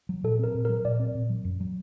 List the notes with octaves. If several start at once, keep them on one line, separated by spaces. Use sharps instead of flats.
F#3
A#2 A4
C4 A#4
A#2
A#4
F#3
A#2 D5
C4
A#2
F#3
F#2
F#3